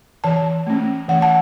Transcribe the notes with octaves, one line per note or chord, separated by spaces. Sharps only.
E3 A5
A3 C#4
E3 F#5
A5